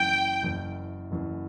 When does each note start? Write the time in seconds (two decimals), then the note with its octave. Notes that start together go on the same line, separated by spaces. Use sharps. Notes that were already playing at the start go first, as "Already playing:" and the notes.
Already playing: F#1 F#2 E3 G5
0.43 F#1 F#2 E3
1.11 F#1 F#2 E3